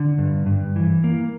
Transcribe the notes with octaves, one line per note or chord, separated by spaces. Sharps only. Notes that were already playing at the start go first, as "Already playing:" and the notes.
Already playing: D3
G2
G2
E3
A#3